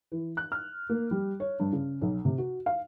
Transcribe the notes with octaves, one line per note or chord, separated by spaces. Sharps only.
E3
F#6
F6
A#3
G3
C#5
G2
C#3
B1
C3
F#4
F5